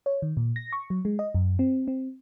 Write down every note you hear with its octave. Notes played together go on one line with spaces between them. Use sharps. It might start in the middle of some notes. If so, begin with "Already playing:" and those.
C#5
D#3
A#2
A#6
C#6
F#3
G#3
D#5
F#2
C4
C4